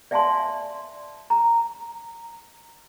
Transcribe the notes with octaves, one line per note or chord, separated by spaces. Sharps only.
D5 E5 F5 G#5 A5 C6
A#5